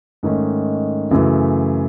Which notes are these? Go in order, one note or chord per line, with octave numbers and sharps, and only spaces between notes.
G#2 D#3 A3 C#4
F#2 C#3 E3 A3